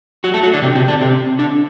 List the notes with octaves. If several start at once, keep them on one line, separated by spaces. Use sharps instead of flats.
F#3 F#4
A3 A4
F#3 F#4
D3 D4
C3 C4
C3 C4
D3 D4
C3 C4
D3 D4